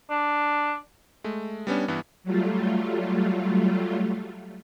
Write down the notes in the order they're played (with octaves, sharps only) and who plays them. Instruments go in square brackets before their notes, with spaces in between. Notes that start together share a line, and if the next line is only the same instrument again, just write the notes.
[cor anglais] D4
[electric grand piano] G#3 A3
G3 B3 C#4 D4
G2 E3 B3
[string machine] F#3 G3 A3 F4